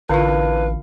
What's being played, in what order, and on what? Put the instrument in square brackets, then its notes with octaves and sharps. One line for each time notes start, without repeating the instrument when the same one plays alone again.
[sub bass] A1 [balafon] D3 F4 [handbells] D4 E4 F5 [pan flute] B4